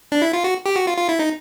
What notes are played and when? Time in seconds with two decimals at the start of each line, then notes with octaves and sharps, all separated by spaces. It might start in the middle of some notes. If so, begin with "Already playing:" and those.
0.12 D4
0.22 E4
0.33 F4
0.44 F#4
0.66 G4
0.76 F#4
0.87 F4
0.97 F4
1.09 E4
1.19 D#4